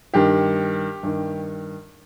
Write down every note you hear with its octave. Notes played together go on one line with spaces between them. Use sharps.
G2 D#3 G4
G2 D#3